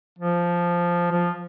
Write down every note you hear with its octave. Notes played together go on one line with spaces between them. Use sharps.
F3
F3